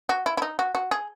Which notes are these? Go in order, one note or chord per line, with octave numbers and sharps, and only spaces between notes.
F#4
E4
E4
D#4
F#4
F#4
G#4